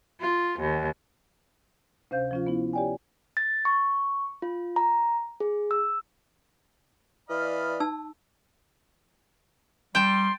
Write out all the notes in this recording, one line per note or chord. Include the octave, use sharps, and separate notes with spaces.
F4
D#2
D2 C3 C#4 C5 F5 G6
F3 C#4 F4
B3 E4
G4 C#5 D5 G5 G#5
A6
C#6
F4
A#5
G#4
E6
E3 D5 D#5 F5 B5 F6
D#4 A5 E6
G3 G5 A5 C6